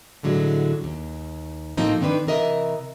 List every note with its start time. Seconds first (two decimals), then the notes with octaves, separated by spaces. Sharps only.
0.23 A2 D3 F#3 G#3
0.84 D#2
1.77 A2 F3 A#3 C4 D#4
2.01 D#3 C4 D4 B4
2.27 C3 E3 A#4 D#5 E5